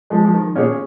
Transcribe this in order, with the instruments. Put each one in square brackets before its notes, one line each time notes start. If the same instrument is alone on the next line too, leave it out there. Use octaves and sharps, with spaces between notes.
[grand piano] F3 [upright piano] G#3
[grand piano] F3
D#3
[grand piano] A#2 [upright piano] C#4 G#4 C#5